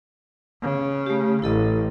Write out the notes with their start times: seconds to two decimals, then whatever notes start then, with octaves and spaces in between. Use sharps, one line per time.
0.62 C#3
1.06 A3 G4
1.42 A1 E4 A4 D#5